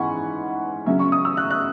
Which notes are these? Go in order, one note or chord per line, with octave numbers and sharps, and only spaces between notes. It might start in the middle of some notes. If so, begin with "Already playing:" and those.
Already playing: G#2 E3 C#4 F#5 G#5 B5 C#6
C#3 F#3 C#4 E5
C#6
D#6
E6
F#6
F#6